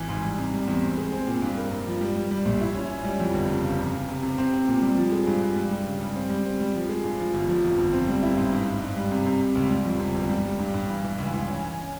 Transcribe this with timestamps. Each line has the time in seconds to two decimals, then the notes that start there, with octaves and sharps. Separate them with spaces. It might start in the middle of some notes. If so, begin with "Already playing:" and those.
Already playing: G#1 E3
0.09 G#2
0.24 G3
0.38 C3
0.53 G3
0.67 E2
0.83 C4
0.97 G#3
1.12 C4
1.27 A#2
1.42 G2
1.57 A#3
1.72 G2
1.87 F3
2.01 G3
2.16 G3
2.31 G3
2.45 A#1
2.61 E4
2.75 C#4
2.90 C#4
3.04 G3
3.20 F2
3.34 G1
3.49 C#3
3.64 C#3
3.78 C3
3.93 C3
4.09 C3
4.23 C3
4.38 C4
4.53 C4
4.68 A#2
4.82 G3
4.97 F3
5.12 G#3
5.27 G2
5.41 G2
5.56 G3
5.71 G3
5.86 C#3
6.01 G3
6.15 C4
6.30 G3
6.45 C4
6.60 G3
6.75 F3
6.89 G#3
7.04 G2
7.19 F3
7.33 G1
7.48 F3
7.63 F2
7.78 G1
7.93 C4
8.08 G3
8.23 E4
8.37 G#2
8.52 G2
8.67 G2
8.82 G2
8.97 G3
9.11 C3
9.26 C3
9.41 C3
9.55 C#2
9.70 G3
9.85 F2
10.00 C3
10.15 G1
10.29 G3
10.45 G3
10.59 G2
10.74 G2
10.89 E3
11.04 E3
11.18 C#2
11.33 E3
11.48 C#4
11.63 C#4